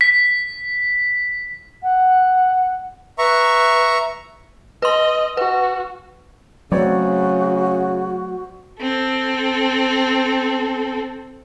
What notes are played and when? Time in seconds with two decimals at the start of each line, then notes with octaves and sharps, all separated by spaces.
0.01 B6
1.83 F#5
3.18 B4 E5 A#5 C#6
4.82 B4 D#5 C6
5.37 F#4 B4
6.72 C#3 F#3 A3 C4 F#4 C#5 D5
8.81 C4 A4